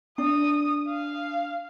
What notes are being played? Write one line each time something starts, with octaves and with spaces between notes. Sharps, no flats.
D4 D#6
F5